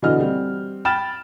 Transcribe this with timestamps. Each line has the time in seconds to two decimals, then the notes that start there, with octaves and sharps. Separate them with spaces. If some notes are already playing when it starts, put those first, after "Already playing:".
0.02 B2 D3 E3 D#5 F6
0.19 G3 C4
0.85 G5 B5 F6 A6 E7